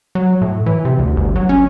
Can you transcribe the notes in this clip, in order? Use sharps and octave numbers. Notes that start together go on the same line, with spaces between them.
F#3
A2
E3
C3
D2
G1
F#3
C#4